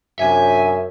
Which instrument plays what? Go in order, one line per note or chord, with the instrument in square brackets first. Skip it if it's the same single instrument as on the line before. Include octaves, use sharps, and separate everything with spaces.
[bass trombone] F#2 [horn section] C3 D4 G#5 [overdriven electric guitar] E5